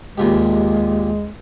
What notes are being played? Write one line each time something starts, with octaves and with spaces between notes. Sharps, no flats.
D#2 A#2 G#3 G4